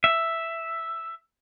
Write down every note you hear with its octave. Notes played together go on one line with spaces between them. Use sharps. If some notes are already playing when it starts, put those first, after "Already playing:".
E5